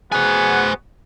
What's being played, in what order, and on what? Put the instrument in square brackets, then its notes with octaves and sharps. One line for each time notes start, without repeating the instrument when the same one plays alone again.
[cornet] B3 [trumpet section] F#4 G#4 [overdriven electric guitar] C5 G#5 [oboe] F#5